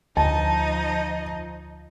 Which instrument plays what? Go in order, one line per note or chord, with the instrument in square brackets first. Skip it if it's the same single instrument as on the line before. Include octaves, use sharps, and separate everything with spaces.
[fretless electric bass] D2 [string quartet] F3 D#4 D#5 [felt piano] A5